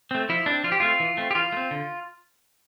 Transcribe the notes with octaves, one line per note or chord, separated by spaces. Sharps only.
A3 C4
F3 E4
A3 C4 D4
F3 F4
G4
A3 C4 F4
E3
A3 C4
G4
E3 F4
A3
C4
D3